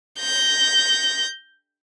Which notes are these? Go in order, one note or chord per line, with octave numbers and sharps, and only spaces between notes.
G6 A#6